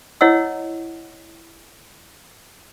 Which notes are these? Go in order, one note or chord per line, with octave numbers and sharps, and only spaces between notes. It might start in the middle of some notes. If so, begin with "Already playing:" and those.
E4 C#5 D#5 F#5 E6